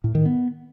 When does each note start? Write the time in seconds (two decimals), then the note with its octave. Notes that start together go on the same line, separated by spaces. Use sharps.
0.04 A2
0.15 D#3
0.26 B3